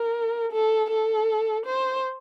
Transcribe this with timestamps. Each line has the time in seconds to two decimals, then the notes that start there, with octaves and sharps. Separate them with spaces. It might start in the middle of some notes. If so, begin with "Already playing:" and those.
Already playing: A#4
0.52 A4
0.90 A4
1.66 C5